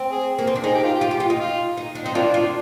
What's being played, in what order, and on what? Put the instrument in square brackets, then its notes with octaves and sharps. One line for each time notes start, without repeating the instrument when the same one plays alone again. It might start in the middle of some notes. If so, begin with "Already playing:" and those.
Already playing: [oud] C4
[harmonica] G#4
[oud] A#3
C4
D4
[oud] D#4 [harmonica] G#4
[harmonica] G4
F4
G4
[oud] F4
G4
F4
D#4
[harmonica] F4
[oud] D#4
D4
[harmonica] C4 [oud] D#4
[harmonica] F3 A#3 D4 [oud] F4
[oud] F4